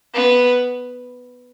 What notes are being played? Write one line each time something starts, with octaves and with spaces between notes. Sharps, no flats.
B3